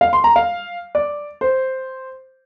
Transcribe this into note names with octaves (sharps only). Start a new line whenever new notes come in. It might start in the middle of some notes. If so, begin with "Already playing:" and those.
F5
C6
A#5
F5
D5
C5